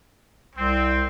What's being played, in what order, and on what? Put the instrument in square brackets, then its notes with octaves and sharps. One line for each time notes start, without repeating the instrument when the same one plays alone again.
[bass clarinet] C2 [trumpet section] C4